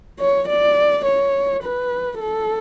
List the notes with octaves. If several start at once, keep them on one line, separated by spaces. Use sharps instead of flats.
C#5
D5
C#5
B4
A4